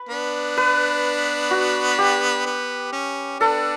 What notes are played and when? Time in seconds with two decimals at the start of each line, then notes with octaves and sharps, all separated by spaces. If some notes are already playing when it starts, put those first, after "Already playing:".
Already playing: B4
0.09 B3 D4
0.57 B4
1.51 F#4
1.98 G4
2.46 B3
2.93 C#4
3.39 B3 D4 A4